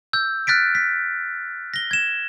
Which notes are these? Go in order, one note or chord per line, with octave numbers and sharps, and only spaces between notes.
E6 G6
F6 F#6 A6 B6 D7
B6
A#6 G7
G#6 E7